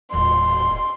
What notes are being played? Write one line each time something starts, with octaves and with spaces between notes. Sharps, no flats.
D#1 A2 C6